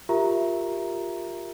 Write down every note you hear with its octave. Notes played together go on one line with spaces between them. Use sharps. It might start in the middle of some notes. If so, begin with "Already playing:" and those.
F4 G4 A#4 E5 A#5